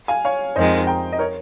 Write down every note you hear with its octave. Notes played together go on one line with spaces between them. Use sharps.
F5 G#5
C#5 F5
F2 D#3 G#3 C5 D#5
G5 A#5
D#5
A#4 C#5